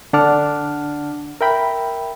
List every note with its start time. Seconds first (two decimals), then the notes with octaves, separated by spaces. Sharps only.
0.13 D3 D4 F#5 A5 D6 F6
1.41 A#4 E5 G5 B5